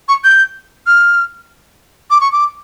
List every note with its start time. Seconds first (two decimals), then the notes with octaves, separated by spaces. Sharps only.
0.09 C#6
0.24 G6
0.87 F6
2.11 D6
2.21 C#6
2.32 D6